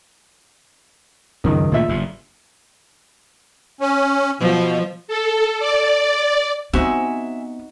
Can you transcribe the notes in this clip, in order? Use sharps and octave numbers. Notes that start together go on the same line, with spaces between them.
C#2 F#2 D#3
A#2 D3 A3 F4 E5
F#1 G2
C#4
B2 F3
A4
D5
B3 C4 D#4 F#4 E5 G#5